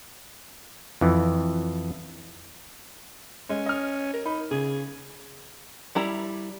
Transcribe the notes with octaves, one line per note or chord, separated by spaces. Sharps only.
F2 E3
G#3 C#4
D#5 F6
A#4
D#4 B5
C#3 G#4
G3 E4 A#5